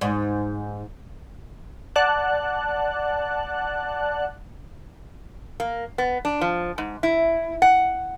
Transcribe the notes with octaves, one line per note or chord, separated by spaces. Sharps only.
G#2
D5 F#5 A5 F#6
A#3
B3
D4
F3
G#2
E4
F#5